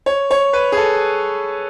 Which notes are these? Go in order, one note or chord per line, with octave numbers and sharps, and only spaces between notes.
C#5
C#5
B4
G#4
A4